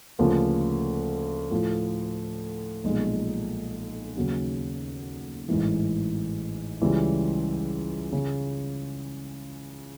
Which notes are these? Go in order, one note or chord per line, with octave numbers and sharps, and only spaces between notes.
D2 C#3 F3 A#3
A2 F3 A3
B1 A#2 F3 G#3
D#2 C#3 F#3
A1 G#2 E3
C#2 C#3 E3 G3
C#3